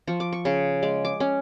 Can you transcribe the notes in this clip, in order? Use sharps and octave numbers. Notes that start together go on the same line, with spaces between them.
F3 C#6
D6
C#6
C#3 C#6
G#3 D6
D6
C#4